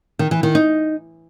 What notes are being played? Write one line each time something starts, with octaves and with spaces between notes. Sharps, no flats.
D#3
E3
D#3
D#4